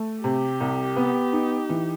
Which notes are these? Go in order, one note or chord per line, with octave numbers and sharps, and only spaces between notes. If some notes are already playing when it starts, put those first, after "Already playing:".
Already playing: A3
C3 G4
C2
B3
D#4
E3